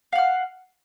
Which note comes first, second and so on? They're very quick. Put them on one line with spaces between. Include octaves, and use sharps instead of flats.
F5 F#5 F6